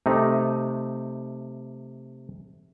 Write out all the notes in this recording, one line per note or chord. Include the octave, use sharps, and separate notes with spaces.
C3 A3 D#4